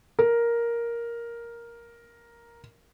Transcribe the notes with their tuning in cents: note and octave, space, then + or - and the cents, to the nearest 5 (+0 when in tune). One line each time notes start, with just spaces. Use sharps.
A#4 +5